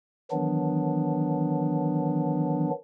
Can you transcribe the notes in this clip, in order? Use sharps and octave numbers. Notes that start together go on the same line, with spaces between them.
D#3 E3 F#3 B3 D4